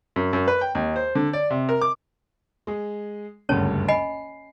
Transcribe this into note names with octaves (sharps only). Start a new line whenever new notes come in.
F#2
F#2
B4
G5
D#2
C5
D3
D5
C3
A#4
D6
G#3 G#4
F#1 D2 G2 C#4 C#5 A5
D#5 G#5 B5 C7